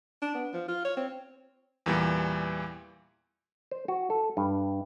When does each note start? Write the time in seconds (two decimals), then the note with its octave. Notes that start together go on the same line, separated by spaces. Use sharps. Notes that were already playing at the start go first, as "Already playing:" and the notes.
0.22 D4
0.35 B3
0.54 F3
0.68 F4
0.85 C#5
0.97 C4
1.86 E2 A#2 E3 G3
3.71 C5
3.88 F#4
4.10 A4
4.37 G2